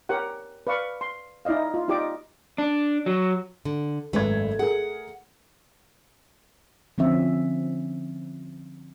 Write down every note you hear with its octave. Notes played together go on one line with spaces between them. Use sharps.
G4 A#4 C#5 F#5
B4 D5 F5 C#6
C6
D#4 E4 D5 D#5 F5
F4
D#4 F4 G4 D5 D#5 D6
D4
F#3
D3
G#1 F#2 A3 B4 G#6
G#4 A#4 F#5
D3 F3 C4 C#4 E5